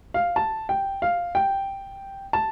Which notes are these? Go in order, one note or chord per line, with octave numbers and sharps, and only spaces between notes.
F5
A5
G5
F5
G5
A5